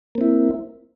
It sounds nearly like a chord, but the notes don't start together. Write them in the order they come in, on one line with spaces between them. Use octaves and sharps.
A#3 C4 E4